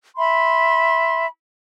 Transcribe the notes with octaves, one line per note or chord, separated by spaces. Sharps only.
E5 B5 C6